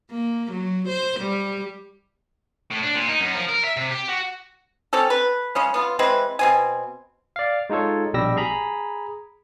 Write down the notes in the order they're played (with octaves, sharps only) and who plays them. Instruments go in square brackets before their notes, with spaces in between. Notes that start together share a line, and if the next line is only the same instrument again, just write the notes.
[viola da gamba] A#3
F#3
C5
G3
[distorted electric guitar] A2
D4
A#2
D#4
F#2
F3
A#4
E5
C3
G4
F#4
[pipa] C4 C#4 G4 A4
B4
C#3 G#3 C#4
B3 F4
E3 G#3 C4 B4
B2 C4 G#5
[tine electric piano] D5 F5
G#3 D#4 F4 A4 C#5
A#1 B2 G3 G4 E6 A#6
G#4 A#5 B5